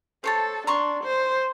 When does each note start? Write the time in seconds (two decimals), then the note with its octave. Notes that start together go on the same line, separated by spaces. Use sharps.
0.24 A4 C5 C#5 A5
0.67 D4 A#5 C6 C#6
1.04 C5